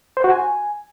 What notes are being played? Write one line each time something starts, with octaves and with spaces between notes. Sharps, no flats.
C5
F#4
G#5